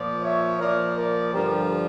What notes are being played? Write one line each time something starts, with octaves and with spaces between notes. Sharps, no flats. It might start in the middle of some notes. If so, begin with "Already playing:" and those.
Already playing: A#2 F3 D5
C#5 E5
A#2 F3 A#4 D5
A#4 D5
G2 D3 F3 G4 A#4